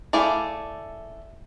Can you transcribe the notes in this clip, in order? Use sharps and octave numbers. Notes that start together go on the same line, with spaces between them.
A3 E4 G#4 D5 F5